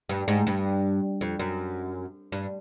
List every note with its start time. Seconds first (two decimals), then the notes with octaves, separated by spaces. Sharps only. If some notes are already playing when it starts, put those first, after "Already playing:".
0.09 G2
0.28 G#2
0.47 G2
1.21 F2
1.39 F#2
2.32 G2